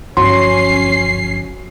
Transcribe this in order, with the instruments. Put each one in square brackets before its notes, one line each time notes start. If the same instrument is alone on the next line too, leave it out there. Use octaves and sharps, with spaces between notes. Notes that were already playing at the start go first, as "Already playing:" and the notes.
[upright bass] G1 F3 [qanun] F#3 [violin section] C#4 C7 [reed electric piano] C6